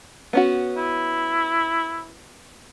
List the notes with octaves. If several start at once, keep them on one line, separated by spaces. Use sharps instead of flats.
B3 C#4 F#4
E4